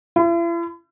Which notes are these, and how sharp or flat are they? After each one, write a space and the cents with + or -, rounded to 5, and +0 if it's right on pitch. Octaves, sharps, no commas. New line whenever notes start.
E4 +45